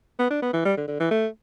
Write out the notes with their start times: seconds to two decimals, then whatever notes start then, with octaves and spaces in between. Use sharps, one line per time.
0.19 B3
0.31 D4
0.42 B3
0.53 E3
0.65 G3
0.77 D3
0.88 D3
1.00 E3
1.11 A3